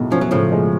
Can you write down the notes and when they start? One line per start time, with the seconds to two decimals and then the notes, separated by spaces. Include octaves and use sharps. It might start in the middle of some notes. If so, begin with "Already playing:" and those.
Already playing: B1 A2 G#3
0.12 F3 C#4
0.21 F#3
0.31 A2 C#3 F3
0.52 G#3